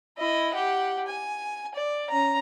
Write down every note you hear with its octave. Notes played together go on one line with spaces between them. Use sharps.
E4 D#5
G4 F#5
G#5
D5
C#4 A#5